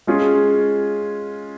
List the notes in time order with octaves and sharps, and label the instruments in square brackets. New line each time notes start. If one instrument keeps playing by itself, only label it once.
[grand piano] G#3 C#4 F4 G#4